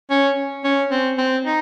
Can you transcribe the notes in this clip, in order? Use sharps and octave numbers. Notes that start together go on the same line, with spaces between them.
C#4
C#4
C4
C4
D#4